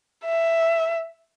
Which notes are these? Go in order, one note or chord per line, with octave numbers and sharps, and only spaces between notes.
E5